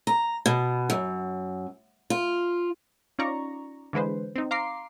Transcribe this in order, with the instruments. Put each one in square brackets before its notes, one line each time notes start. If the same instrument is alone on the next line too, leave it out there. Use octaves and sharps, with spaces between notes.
[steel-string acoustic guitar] A#5
B2
F#2
F4
[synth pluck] C#4 D#4 F4 D5 A#5 C#6
D3 E3 G#3 B4 C5
C4 D#4
F5 A#5 C6 D6 C7